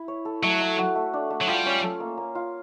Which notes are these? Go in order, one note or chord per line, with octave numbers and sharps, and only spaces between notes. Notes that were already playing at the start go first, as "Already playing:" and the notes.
Already playing: E4
C#5
A4
F#3 A3
A3
F#4
A3
D4
A3
F#3
G3 F4
C#4
A4
A#3
A#3
F4